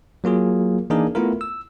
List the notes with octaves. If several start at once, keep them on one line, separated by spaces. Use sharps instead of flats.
F#3 A#3 F4 G#4
E3 A#3 D4 D#4 G#4 A#4
A3 B3 E4 F4 A#4
E6